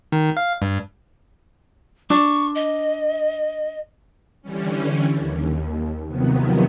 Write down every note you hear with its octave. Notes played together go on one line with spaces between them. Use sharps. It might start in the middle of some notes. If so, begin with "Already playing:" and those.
D#3
F5
G2
D4 C#6
D#5
D3 E3 G3 C#4
D#2
C3 D#3 F3 F#3 B3